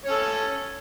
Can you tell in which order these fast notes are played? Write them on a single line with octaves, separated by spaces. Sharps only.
C#5 C#4 A4